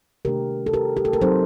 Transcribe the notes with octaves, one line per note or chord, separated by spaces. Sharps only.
C3 D#3 A3 D4 G4 A#4
A4
G4 A#4
G4
A4
A#4
F#3 C4 D#4 A4 C5